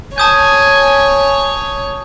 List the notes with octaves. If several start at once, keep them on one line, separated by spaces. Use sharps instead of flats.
C#5 G#5 A5 D#6 G6